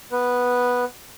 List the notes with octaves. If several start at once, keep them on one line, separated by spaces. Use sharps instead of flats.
B3 B4